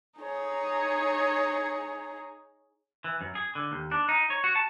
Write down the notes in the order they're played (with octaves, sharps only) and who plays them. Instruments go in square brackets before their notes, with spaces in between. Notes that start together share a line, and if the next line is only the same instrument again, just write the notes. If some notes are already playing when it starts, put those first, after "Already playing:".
[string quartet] D#4 G#4 C#5
[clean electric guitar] E3
F#2
G#4
D3
D#2
D4
D#4
C#5
F#4
A5